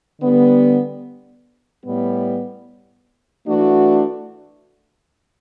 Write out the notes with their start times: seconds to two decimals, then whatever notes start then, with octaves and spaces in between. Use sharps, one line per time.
0.21 D3 G3 B3
1.84 A2 G3 B3
3.47 E3 A3 D4 F#4